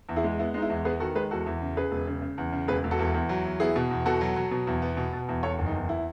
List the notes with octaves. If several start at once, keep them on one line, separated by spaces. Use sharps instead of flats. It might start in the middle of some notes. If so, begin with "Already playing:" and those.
E2
E4 G#4
G#3
B3 E4
G#3 D#4
E4
E2
B3 G#4 B4
D#3 F#4 A4
G#3 G#4 B4
E2 F#4 A4
E2
C#3
C#3 G#4 B4
E1
C#3
C#3
E2
C#3
E1 G#4 B4
E1
F#4 A4
E2
E2
F#3
E2
B3 E4 G#4
B2
E2
B2 F#4 A4
F#3
F#3
B2
E2
B3
B2
B2
E2
E2 A4 C#5
F#1
D#4
E2
E4